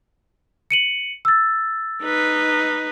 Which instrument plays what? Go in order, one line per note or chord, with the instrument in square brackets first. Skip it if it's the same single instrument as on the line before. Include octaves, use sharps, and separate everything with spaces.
[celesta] C#7 D#7 F#7
E6 A6
[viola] D#4 B4